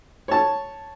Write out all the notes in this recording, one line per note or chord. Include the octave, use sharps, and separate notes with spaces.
C#5 A5